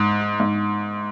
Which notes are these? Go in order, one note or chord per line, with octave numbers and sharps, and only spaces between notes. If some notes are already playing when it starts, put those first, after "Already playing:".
Already playing: G#2
G#2